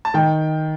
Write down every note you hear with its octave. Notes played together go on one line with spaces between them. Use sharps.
A5
D#3 G5